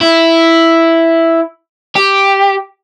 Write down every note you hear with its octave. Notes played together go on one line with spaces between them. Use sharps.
E4
G4